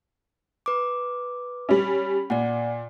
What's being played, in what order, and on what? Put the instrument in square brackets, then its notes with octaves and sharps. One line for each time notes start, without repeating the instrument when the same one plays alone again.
[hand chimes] B4 D6
[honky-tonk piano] G3 C#4
[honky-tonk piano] A#2 [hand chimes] D5 F#5